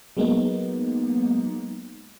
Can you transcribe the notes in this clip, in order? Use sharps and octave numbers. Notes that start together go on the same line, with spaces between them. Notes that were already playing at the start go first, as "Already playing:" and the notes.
F#3 G#3 A#3 B3 D#4